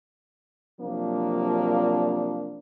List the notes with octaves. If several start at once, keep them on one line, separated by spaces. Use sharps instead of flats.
C3 F3 F#3 A#3 D4